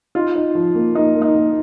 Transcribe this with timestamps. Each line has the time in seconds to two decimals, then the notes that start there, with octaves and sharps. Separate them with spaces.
0.15 D#4 F4
0.35 D#4
0.55 F3
0.75 A#3
0.95 A#3 D#4
1.15 A#3
1.22 D#4
1.35 A#3